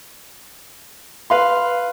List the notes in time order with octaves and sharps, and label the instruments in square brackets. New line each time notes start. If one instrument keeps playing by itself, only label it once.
[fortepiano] B4 F5 C6